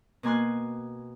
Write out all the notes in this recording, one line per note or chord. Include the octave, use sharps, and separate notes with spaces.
B2 A#3 G#5 C6 F#6